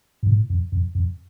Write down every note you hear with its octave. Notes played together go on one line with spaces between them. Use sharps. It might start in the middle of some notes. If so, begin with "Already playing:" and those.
G#2
A2
F2
F2
F2